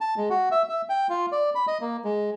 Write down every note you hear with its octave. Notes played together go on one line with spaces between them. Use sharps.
A5
G#3
F#4
E5
E5
G5
F4
D5
B5
D#5
A#3
G#3